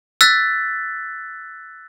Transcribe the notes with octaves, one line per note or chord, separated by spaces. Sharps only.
E6 F#6 A6 B6